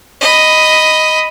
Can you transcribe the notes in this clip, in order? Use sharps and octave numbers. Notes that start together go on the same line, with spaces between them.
D#5 B5